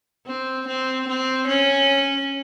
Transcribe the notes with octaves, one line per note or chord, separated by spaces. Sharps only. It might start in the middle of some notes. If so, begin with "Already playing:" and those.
C4
C4
C4
C#4